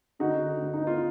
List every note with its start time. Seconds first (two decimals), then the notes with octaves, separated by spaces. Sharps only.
0.19 D3 D#4 F#4
0.40 D3
0.61 D2
0.74 D#4
0.80 B3
0.87 F4